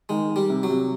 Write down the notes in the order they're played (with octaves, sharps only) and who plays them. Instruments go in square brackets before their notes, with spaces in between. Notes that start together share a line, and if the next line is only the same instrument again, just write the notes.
[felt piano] D#3 [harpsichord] G#3
[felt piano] D#3
[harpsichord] G3
[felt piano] C3
[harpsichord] F#3
[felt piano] C3